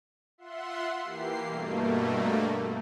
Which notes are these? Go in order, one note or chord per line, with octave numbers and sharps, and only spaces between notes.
F4 E5 F#5 C6
E3 A#3 G4 C7
G2 B2 A3 A#3